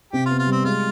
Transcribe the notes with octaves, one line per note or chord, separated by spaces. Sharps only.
C3 G4
F4
B3
F4
G3 C4
G#3 F4